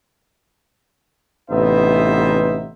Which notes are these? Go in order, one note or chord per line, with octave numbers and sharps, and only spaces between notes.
A1 C3 B3 D#4 C5 E5